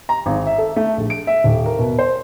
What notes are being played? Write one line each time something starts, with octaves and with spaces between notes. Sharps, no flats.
A#5
G#1
E5
A4
A3
A#1
D7
E5
D#1
A#4
B2
C5